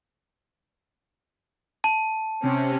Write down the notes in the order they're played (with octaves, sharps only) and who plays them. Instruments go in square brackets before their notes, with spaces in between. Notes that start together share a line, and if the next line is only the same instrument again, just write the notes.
[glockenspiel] A5
[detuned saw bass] C3 [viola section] C4 C#4